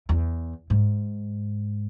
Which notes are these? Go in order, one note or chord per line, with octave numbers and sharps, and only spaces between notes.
E2
G#2